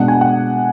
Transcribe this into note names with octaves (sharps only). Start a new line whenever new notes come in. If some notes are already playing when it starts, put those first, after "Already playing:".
Already playing: B2 G#3 D4 F#5
G#5
F#5